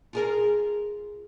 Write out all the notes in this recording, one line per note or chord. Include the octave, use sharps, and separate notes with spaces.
F4 G#4 A#4